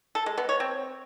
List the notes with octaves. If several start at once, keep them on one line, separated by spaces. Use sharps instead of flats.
A4
G#3
B3
C#5
C4